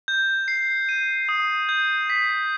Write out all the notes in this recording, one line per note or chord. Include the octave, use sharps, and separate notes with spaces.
G6
C7
D#7
D#6
G6
B6